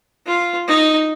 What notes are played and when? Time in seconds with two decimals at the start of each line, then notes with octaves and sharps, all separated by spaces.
0.27 F4
0.68 D#4